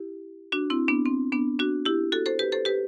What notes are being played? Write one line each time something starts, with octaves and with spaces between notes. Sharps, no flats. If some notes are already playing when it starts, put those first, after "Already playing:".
Already playing: E4 G4
D4 F#4
C4 E4
B3 D4
C4
B3 D4
D4 F#4
E4 G4
F#4 A4
A4 C5
G4 B4
A4 C5
G4 B4